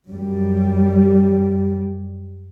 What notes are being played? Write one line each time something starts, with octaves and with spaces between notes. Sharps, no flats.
F#2 G3